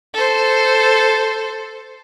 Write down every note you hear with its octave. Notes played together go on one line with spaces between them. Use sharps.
A4 C5